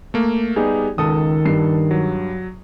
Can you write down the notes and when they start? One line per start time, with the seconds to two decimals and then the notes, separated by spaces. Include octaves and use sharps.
0.14 A3 A#3
0.56 G3 B3 D#4 G4 G#4
0.98 C#2 D#3 A4 D#6
1.45 G2 C7
1.91 F#3